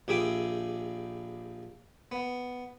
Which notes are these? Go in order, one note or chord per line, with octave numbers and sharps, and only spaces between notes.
A#1 G4 G#4 E5 D6 D#6
B3